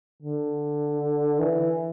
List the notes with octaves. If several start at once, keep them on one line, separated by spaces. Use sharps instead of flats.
D3
E3